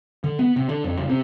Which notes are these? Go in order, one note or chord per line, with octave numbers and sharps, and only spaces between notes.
D3
B3
C3
D3
F2
F#1
C3